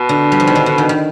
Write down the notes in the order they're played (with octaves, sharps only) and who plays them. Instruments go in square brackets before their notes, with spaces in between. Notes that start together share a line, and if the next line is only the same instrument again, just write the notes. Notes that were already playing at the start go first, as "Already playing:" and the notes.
Already playing: [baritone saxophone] B2
[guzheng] D3
G3
F3
D#3
D3
D3
D#3
D#3